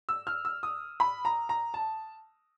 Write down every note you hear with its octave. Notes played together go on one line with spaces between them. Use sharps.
E6
F6
E6
D#6
B5
A#5
A#5
A5